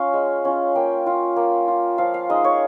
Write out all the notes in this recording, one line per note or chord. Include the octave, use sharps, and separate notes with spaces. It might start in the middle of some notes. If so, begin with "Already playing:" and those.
Already playing: C#4 F4 F5
G#3
C#4 F4
A#3 G5
F4
A#3
F4
F3 F5
F5
G#3 D#4 D#5
C#5